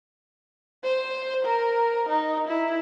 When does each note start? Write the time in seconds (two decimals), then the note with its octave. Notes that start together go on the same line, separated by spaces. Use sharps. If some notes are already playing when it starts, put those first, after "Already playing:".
0.84 C5
1.45 A#4
2.10 D#4
2.48 E4